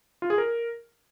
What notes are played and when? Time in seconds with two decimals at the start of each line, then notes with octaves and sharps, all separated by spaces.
0.22 F4
0.30 G#4
0.38 A#4